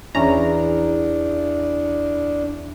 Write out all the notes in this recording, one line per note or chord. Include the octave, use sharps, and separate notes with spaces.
E2 C#4 D4 E4 A#5